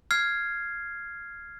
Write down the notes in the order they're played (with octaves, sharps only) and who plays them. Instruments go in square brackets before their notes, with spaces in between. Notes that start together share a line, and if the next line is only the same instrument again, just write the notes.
[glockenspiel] F6 G#6 C7